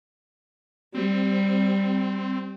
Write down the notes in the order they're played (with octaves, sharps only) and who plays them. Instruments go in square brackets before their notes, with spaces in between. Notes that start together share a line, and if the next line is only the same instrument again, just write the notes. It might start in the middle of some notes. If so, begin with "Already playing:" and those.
[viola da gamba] G3 [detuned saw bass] C4